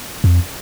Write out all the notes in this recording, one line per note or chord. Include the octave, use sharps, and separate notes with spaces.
F2